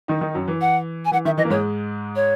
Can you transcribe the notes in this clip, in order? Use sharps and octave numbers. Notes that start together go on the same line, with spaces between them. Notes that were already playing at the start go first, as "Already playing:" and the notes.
D#3 D#4
D#3 D#4
F#2 F#3
E3
F#5
G#5
E3 F#5
D#3 E5
E3 D#5
A#3
G#2 G#3 C#5
C#5